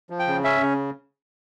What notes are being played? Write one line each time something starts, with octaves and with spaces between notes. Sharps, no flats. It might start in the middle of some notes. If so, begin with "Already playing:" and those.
F3
G5
C#3
C#4 E5
C#3